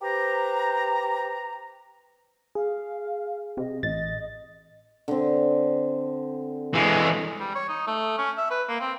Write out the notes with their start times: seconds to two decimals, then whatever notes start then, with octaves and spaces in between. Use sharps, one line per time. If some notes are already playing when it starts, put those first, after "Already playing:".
0.02 G4 B4 C5 A#5
2.55 G#4 F5
3.57 C3 D#5
3.83 A1 D#5 A6
5.08 D3 C4
6.74 E3 G#3
7.41 G3
7.55 C#5
7.69 D#4
7.87 A3
8.18 C#4
8.37 E5
8.51 B4
8.69 A#3
8.81 C4